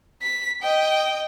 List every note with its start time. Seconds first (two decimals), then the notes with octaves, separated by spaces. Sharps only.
0.22 B6
0.62 D#5 G5